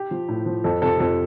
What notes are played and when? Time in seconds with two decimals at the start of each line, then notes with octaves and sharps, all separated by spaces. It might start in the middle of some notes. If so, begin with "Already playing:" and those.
Already playing: G4
0.11 F3
0.28 A2
0.46 F3
0.64 F2 A4
0.82 C3 F3 A4
1.00 F2 A4